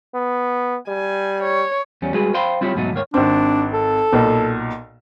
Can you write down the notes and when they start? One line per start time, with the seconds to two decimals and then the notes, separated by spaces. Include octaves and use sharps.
0.15 B3
0.88 G3 G#5
1.43 C#5
2.02 E2 G3 C#4
2.14 G3 G#3 F#4 G#4 B4
2.34 C5 F5 G5 B5 C6
2.61 G3 C4 E4 F4 G4 C#5
2.75 E2 G#2 B2 F#3 A3 D#4
2.93 D#2 G#2 A#3 C#5
3.14 G#1 C4 D4
3.73 A4
4.13 B1 A#2